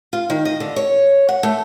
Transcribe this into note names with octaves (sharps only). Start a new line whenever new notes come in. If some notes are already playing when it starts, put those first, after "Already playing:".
F4
D#3
D#5
D3
C#5
F#5
A3